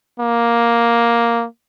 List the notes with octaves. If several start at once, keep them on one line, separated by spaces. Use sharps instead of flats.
A#3